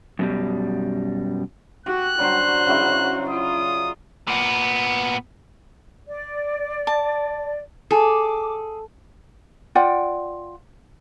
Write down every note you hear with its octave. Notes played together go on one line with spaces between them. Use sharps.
F#2 B2 G3
F#4 G4 F#6
D3 F#3 G3 F#4 C5
C#3 F#3 E4
F4 D#6
A#2 B3
D5
A5
G#4 A4 D6
F4 D5 F#5 G5